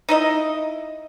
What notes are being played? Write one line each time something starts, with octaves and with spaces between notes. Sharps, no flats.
D#4 E4 D#5